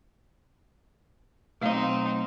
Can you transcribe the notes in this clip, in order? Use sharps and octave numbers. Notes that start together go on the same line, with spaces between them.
B1 A3 C4 D#4 D#5 F5